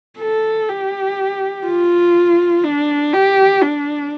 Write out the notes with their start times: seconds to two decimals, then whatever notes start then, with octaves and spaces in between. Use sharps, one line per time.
0.19 A4
0.69 G4
1.66 F4
2.64 D4
3.13 G4
3.62 D4